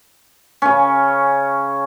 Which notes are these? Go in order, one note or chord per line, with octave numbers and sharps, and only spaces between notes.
C#3 C#4